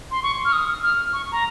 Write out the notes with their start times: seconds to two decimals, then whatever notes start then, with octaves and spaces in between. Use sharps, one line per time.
0.11 C6
0.23 C#6
0.45 F6
0.53 D#6
0.83 F6
1.13 C#6
1.32 A#5